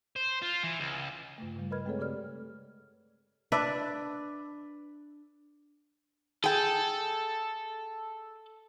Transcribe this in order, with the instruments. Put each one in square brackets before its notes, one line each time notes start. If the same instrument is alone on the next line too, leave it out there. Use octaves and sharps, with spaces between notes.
[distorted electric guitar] C5
F4
E3
C#2
[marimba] G2 C#3 A3
C#3 G3
A#4 B4 D#5 B5 F6 G#6
G#3 A3 C4 G#4 A4 C#5
C#3 G4 A4 D5 F6
[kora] D4 B4 E5
[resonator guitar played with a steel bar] G#4 G5 [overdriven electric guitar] A4